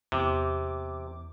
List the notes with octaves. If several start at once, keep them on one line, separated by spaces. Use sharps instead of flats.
E2 C3 D6